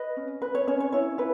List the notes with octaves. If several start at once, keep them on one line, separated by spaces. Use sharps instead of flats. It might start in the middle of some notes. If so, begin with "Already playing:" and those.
Already playing: B4 D#5
C#4
B4
C#5
C#4 C#5
C#5
E4 C#5
E4 B4